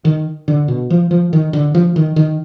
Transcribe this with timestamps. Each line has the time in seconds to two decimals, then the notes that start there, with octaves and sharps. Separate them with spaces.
0.05 D#3
0.48 D3
0.68 B2
0.90 F3
1.11 F3
1.33 D#3
1.53 D3
1.75 F3
1.96 D#3
2.16 D#3